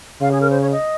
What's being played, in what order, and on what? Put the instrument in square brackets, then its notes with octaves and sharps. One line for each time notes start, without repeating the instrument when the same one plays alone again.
[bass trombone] C#3 [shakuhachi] F5
[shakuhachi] G#4
A#4
C5
C#5
D#5